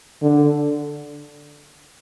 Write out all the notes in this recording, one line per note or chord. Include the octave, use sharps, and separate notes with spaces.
D3